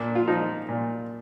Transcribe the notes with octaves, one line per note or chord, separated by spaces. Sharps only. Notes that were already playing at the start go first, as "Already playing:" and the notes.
Already playing: A#2 D4
F4
F3 D#4
A#2